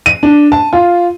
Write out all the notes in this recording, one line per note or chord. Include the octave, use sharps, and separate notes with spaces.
D#7
D4
A5
F4